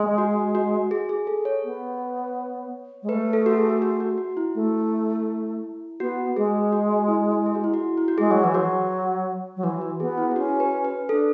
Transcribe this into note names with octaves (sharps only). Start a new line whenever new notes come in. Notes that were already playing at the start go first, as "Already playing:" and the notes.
Already playing: G#3
F#4
F#4
G#4
G#4
A4
C#5
B3
G#3
A3 B4
A4
F#4
G#4
F#4
F#4
F#4
E4
A3
B3 F#4
G#3 G#4
F#4
E4
G#4
F#4
E4
F#4
E4
F#4
G#3 G#4
F#3
E3
F#3 F#4
F#3
E3 F#4
F#4
B3 G#4
E4
G#4
C#4 F#4
B4
B4
D4 A4